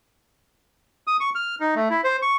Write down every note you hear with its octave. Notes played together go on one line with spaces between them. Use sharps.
D#6
C#6
F6
D#4
A3
E4
C5
C#6